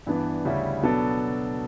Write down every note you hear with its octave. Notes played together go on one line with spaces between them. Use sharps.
G2 E3 B3 D4
D2 C#3 G3 C#4 E4
B2 F#3 B3 D4 A4